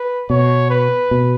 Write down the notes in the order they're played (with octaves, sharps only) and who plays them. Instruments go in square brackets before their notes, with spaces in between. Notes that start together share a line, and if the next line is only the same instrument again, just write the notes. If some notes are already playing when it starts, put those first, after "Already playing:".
Already playing: [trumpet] B4
[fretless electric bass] B2 [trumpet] C#5
[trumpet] B4
[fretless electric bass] B2